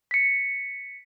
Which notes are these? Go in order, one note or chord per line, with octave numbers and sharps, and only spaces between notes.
B6 C#7